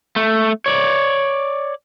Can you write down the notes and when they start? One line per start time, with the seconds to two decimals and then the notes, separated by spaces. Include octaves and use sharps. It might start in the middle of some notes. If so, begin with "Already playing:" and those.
0.16 A3
0.66 C#5 D5